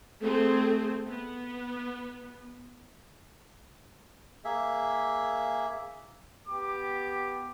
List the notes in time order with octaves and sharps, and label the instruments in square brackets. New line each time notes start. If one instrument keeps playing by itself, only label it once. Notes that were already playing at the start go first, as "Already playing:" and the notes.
[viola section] A3 C4 G#4
B3
[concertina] A#3 G#4 E5
[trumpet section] B3 G4 D6